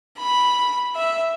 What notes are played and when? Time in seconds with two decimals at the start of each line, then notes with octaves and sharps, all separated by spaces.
0.18 B5
0.96 E5